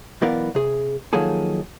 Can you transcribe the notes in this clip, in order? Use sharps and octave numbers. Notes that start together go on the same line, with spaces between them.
B1 E3 B3 A#4 D5 F5
C3 G#4
D#3 F3 F#3 A#3 G#4 A4